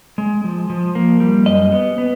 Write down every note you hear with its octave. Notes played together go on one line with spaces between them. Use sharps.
G#3
F3
F3
A#3
G3
F#2 D#5
B3
B3